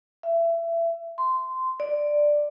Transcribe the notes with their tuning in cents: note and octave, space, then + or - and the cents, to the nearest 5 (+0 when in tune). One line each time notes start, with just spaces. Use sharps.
E5 +25
C6 -15
D5 +5